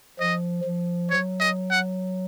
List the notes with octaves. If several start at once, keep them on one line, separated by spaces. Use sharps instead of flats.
F3 D#5
F3
F#3 C#5
D#5
F#5